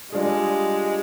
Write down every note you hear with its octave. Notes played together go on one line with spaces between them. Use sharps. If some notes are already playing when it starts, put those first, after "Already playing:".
G3 G#3 D4 F4 G#4